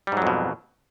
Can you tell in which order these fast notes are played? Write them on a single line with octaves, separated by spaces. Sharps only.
G3 G#2 F#3 F2 B2